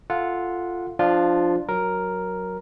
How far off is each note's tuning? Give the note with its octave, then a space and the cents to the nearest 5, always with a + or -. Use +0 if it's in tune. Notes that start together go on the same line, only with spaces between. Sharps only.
F4 -5 A4 +0 F#5 -15
F3 +0 D4 +15 F4 +0
F#3 -5 A#4 +0